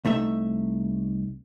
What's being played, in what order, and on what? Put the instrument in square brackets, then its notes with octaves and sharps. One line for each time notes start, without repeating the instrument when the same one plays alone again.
[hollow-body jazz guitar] C2 A3 D#4 E5